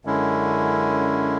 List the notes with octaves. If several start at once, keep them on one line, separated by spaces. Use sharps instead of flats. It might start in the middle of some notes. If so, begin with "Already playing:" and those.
F#2 D3 G#3 C#4 E4